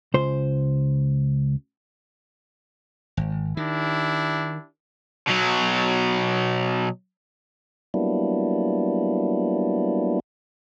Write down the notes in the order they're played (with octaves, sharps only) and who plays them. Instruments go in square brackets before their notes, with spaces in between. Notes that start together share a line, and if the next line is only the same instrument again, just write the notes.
[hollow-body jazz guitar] C#2 C5
[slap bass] G#1
[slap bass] D#3 [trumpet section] D4 E4 G4
[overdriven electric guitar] B2 F#3
[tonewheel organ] F#3 G3 A#3 B3 D4 E4